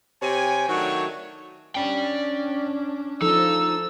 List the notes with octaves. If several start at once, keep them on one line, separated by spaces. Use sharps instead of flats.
C3 C#5 G5 G#5
D#3 F#3 A3 D4 F#4 C#5
C#4 D4 D5 G5
F3 D#4 A4 E6